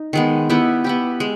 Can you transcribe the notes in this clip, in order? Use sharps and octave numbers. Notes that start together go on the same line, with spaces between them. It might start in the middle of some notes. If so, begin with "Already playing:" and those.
Already playing: D#4
D#3 G#3 B3
B3 E4 G4
B3 E4 G4
G#3